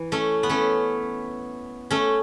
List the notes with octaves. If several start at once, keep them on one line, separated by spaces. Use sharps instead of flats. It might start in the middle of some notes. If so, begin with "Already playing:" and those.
Already playing: E3
A3 C#4
B3
A3 C#4
A3 C#4